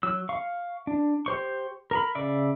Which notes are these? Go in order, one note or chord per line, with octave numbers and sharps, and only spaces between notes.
F#3 E6
F5 C#6
D4
G4 C5 C#6
A#4 A#5 B5
C#3 D5 E5